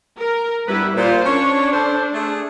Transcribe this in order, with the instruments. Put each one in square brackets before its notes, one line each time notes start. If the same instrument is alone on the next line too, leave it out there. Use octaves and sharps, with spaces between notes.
[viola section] A#4
[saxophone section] G2 B3 B4 [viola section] G3 E4
[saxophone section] A#2 [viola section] F4 C5
[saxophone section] C#4 C#5 [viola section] D4
[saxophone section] A4 C5
A3 G#4